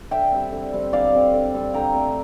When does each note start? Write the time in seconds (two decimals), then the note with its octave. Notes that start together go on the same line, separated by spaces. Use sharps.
0.11 D3 E5 G5
0.32 G3 C4
0.52 D3
0.73 G3 C4
0.92 D3 D5 F5
1.13 G3 C4
1.34 D3
1.54 G3 C4
1.74 D3 G5 A#5
1.95 A3 C4